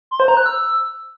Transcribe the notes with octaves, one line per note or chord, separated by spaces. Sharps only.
C6
C5
A#5
F#6
E6